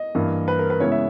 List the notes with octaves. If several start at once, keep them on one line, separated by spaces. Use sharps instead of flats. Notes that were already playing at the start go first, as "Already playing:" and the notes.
Already playing: D#5
G2 E3 A#3
B4
A#4
B4
C#3 G#3 B3 E4 C#5
E5